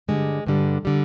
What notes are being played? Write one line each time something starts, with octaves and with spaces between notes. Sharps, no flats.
G2 D3 G3 G#3
G2 D3 G3
D3 G3